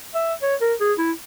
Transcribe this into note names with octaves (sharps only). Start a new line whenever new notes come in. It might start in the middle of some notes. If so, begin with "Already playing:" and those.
E5
C#5
A#4
G#4
E4